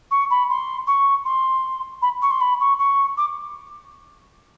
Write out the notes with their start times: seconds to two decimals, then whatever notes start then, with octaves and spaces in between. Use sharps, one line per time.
0.11 C#6
0.30 B5
0.50 C6
0.87 C#6
1.25 C6
2.02 B5
2.22 C#6
2.31 C6
2.41 B5
2.60 C#6
2.78 C#6
3.17 D6